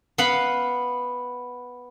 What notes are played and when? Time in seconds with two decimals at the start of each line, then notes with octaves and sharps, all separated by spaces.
0.18 B3 F5 F#5 B5